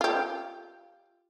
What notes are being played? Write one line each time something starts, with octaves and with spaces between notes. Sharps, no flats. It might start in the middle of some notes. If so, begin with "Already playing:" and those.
F4 G4